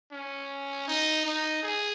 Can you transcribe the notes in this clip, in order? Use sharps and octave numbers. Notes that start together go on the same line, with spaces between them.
C#4
D#4
D#4
G#4